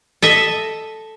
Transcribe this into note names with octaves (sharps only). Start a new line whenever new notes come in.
A4 D#5 E5